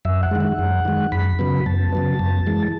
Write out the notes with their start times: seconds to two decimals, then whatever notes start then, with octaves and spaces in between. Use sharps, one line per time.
0.05 F#2 E5
0.23 F#5
0.31 D#3 G#3
0.40 F#5
0.59 F#2
0.85 D#3 G#3
1.12 F#2 B5
1.39 C#3 F#3 B3
1.66 F#2 A5
1.93 C#3 F#3 B3
2.19 F#2
2.47 E3 G#3